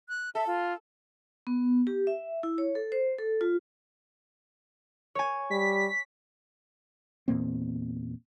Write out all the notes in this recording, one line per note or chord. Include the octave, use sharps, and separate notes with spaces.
F#6
A4 E5
F4
B3
G4
E5
E4
C#5
A4
C5
A4
F4
C#5 G#5
G3 B6
E2 A#2 A#3 C4